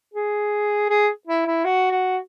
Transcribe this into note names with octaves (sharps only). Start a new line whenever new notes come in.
G#4
G#4
E4
E4
F#4
F#4